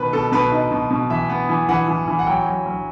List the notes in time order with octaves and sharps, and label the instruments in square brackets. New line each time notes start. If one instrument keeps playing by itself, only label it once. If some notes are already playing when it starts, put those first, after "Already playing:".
Already playing: [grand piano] B2 D#3 B4
B2 A4
B2 B4
D#4
B2
B2
E3 E5
B3
E3
E3 F#5
E3
E3
F#5
F#3 G5
F#3
F#3